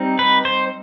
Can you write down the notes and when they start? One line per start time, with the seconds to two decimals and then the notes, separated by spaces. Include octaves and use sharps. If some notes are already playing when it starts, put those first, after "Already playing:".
Already playing: G3 C4 D#4
0.19 B4
0.45 C5